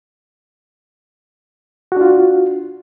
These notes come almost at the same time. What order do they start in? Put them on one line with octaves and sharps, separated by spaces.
F#4 D4 F4